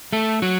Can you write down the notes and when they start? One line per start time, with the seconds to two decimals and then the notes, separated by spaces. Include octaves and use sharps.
0.13 A3 A4
0.42 F#3 F#4